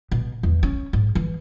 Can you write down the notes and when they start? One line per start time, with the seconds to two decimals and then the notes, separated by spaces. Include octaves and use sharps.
0.11 B2
0.43 E2
0.63 C#4
0.93 G#2
1.15 E3